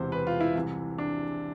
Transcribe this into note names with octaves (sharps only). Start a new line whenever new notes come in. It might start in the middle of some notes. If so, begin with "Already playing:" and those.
Already playing: E1 E2 C3 E3 C5
B4
F4
E4
C2 C3 E3
D4